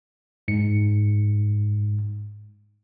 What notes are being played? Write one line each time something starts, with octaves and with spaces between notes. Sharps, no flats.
G#2 C#7